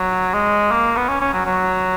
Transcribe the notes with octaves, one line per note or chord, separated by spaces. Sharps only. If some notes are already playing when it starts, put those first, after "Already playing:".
Already playing: F#3
G#3
A#3
B3
C#4
C#4
F#3
F#3